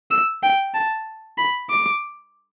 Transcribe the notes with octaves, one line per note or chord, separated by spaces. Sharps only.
E6
G5
A5
B5
D6